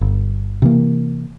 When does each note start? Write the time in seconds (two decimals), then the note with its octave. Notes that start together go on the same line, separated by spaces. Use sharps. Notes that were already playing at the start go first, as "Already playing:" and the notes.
0.01 G1
0.62 C3 E3 A#3